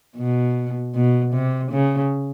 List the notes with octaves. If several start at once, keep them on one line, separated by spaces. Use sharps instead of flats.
B2
B2
C3
C#3